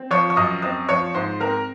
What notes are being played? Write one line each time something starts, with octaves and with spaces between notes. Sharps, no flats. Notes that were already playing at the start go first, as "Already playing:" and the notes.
Already playing: C4
F3 C#5 C#6
C#6
F#2 D#5 D#6
C4 D#5 D#6
F3 C#5 C#6
G#2 C5 C6
C4 A#4 A#5